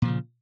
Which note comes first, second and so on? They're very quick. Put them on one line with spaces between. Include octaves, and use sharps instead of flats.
A#2 F3 C#3